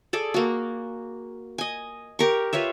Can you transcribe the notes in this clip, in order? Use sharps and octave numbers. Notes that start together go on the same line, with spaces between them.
G#4 A4 D5
A#3 F#4
D#5 G#5
G4 A#4 C#6
F4 B4 C#5 E5